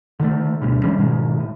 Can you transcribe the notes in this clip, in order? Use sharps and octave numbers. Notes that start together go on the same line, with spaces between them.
D3 D#3 G3 A3
D2 G2 B2
E3 G3 G#3 C#4
G#2 B2 D#3 G#3
A2